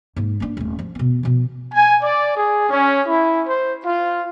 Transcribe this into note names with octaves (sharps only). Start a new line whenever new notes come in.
G#2 A#3
A#3 D4
D#1 A3
F3
B2 B3
B2 F3
G#5
D5
G#4
C#4
E4
C5
F4